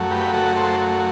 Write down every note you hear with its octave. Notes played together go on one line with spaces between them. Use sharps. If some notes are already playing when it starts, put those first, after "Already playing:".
Already playing: F#2 F#3 A3
G4 B4
F#4 A4
A4 C5